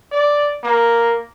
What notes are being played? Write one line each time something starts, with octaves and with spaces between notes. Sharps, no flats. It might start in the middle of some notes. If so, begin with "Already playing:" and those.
D5
A#3